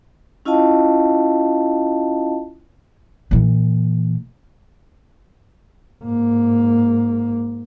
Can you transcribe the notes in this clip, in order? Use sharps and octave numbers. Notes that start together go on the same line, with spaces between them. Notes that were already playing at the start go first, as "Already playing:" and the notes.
C#4 E4 F4 D#5 F5 A5
A#2 E3
G#2 A#3